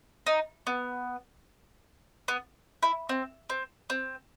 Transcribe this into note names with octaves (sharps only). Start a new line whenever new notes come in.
D#4
B3
B3
E4
C4
C4
C4